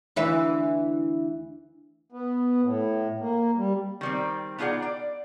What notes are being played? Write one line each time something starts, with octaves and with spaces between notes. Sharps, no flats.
D2 E3 E5
B3
A2
A#3
G3
D#3 G3 C4
B3 D#4 F4 G#4 D5 F#5
D5